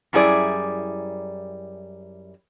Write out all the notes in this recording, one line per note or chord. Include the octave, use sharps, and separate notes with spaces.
F#2 G3 E4 G#4 D5